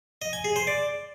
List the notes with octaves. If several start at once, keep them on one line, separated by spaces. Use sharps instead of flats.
D#5
G#5
G#4
C5
D5